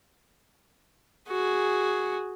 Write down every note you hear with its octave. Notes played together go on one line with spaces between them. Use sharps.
F#4 G#4